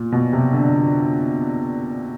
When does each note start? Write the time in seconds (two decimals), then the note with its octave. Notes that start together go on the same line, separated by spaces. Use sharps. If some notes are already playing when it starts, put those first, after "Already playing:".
Already playing: A#2
0.12 B2
0.33 C3
0.53 D3